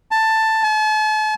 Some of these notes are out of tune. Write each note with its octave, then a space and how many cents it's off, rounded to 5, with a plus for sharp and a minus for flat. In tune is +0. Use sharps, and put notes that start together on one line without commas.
A5 +10
A5 -40